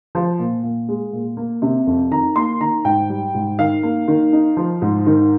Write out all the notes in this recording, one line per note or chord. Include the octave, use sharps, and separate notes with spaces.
F3
A#2
A#2
G#3
A#2
A#3
C3
F2
D#3 A#5
A#3 C6
D#3 A#5
G#2 G5
G3
G#2
D#3 F5
A#3
D#3
D#4
F3
G#2
D#3